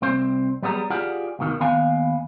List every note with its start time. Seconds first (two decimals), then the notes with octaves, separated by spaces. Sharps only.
0.02 C2 C4 C5
0.62 F#3 G3 B3 G#4 A#5
0.90 F4 G4 G#4 D5 F#5
1.39 C#2 B2 D#3
1.60 D#2 D#3 B3 F5 G#5